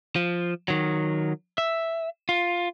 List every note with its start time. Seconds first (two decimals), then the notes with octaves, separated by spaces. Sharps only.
0.16 F3
0.68 D#3 F#3
1.58 E5
2.29 F4